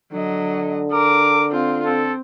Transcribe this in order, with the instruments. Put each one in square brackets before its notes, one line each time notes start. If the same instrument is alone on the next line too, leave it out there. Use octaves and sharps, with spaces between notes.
[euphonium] D3 [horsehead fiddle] F#3 D#5
[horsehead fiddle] A#4 [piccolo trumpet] D6
[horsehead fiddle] C4 F4
[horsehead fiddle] C4 [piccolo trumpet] A4